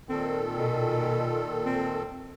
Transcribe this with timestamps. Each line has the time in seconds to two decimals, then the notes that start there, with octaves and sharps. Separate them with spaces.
0.09 A#2 D#3 C4 A4
0.58 B2
1.66 C4